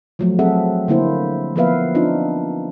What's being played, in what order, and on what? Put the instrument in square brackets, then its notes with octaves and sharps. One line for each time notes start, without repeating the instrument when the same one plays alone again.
[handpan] F3 F#3 A3
C4 G#4 A4 E5 F#5
D3 A#3 E4 C5
F3 A#3 B3 B4 E5 F5
C4 D4 D#4 F4